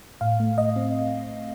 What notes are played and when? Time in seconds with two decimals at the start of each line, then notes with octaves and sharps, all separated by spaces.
0.21 A2 F5
0.40 A3
0.57 A2 D#5
0.76 C4